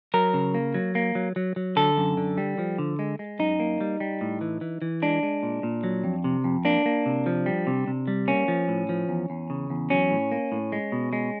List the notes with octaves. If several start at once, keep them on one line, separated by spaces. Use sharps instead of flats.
F#3 A#4
C#3
A#3
F#3
A#3
F#3
F#3
F#3
D3 A4
F#2
D3
G3
F3
D3
G#3
G#3
F#2 D#4
A#3
G3
G3
A2
E3
E3
E3
G#3 D4
G#3
A#2
A#2
F#3
F2
C3
F2
A#3 D4
A#3
C3
F3
G3
C3
C3
G3
A#3 C#4
F3
A2
F3
E2
E2
C#3
E2
F#3 C#4
A2
A#3
A2
G#3
B2
G#3